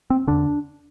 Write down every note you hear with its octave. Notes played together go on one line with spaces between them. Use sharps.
C4
E2 D3 D4